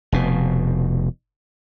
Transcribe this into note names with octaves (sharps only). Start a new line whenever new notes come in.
F1 B2